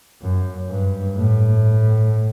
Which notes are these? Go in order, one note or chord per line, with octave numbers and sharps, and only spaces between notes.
F#2
G2
A2